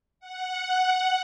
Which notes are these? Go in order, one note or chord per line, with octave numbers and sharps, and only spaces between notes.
F#5